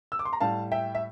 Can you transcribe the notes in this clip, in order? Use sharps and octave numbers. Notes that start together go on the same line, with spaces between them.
E6
D6
C6
A#5
A2 G3 F5 A5
E5 G5
E5